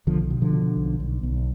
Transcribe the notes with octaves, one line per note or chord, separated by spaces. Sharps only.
B1 D3 F3
B2
D3 F3
B2
B1
B1
B1